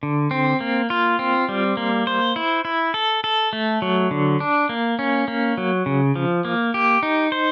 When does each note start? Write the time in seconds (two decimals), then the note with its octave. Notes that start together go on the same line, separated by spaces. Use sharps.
0.03 D3
0.31 C4
0.61 A#3
0.90 F4
1.19 C4
1.49 G3
1.77 A#3
2.07 C5
2.36 E4
2.65 E4
2.94 A4
3.24 A4
3.53 A3
3.82 F#3
4.11 D3
4.40 D4
4.69 A#3
4.99 C#4
5.28 A#3
5.58 F#3
5.86 C#3
6.16 F3
6.45 A#3
6.74 G4
7.03 D#4
7.32 C5